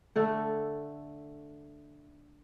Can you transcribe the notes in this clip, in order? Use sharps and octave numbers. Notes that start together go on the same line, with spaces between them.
D3 A3 A4